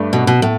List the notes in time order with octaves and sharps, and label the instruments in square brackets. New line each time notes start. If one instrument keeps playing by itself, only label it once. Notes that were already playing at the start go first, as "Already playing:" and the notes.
Already playing: [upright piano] G2 A3 D4
[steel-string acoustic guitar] B2
B2
A2